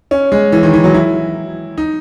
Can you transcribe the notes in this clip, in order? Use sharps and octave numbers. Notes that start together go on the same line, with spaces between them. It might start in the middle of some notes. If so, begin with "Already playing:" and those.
C#4
G#3
E3
D#3
E3
F#3
E4
D#4